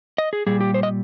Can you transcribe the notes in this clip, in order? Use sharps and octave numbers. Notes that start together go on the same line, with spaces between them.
D#5
G#4
A#2 G3 G#4
G4
C5
D#5